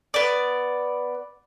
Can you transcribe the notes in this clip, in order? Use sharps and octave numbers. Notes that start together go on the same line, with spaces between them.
B3 D5